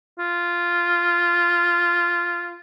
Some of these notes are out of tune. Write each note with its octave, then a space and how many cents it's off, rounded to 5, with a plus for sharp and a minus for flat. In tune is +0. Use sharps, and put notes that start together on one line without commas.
F4 -10